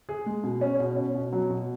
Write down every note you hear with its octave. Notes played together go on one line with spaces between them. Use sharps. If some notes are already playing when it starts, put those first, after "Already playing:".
G#4
G#3
B2
C#4
B2
C#4
B2
F#3
B2